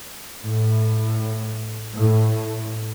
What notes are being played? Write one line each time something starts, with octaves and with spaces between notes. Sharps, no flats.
A2
A2